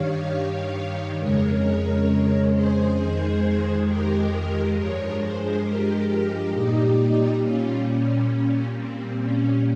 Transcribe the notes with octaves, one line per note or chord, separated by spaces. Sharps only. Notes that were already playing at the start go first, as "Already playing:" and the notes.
Already playing: G2 D#3 G3 C#5 F5
F2 C#3 G#3 A#4 C#5
G#4 C5
F2 D#3 G#3
G4 A#4
G2 F3 G#3 A#4 C#5
G#4 C5
G4 A#4
G4 A#4
A#2 G3 D#4 G4
C#4 F4
C#4
A#2 G3
C4
C#4